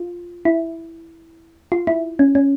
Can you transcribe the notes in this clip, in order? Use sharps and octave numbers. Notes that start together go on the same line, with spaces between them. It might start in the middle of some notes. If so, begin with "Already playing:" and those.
Already playing: F4
E4
F4
E4
C#4
C#4